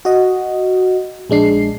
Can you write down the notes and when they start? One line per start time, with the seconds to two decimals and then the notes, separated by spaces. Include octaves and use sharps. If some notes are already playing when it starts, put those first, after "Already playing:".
0.05 F#4 D#5
1.30 A#1 G#3 D4 C7